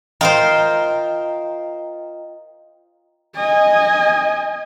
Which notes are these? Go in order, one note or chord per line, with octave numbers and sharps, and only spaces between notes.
F4 A#4 C5 D#5 G5 A#5
D#5 G#5